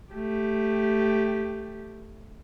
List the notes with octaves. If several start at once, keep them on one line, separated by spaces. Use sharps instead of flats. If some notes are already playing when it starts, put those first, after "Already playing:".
A3 G4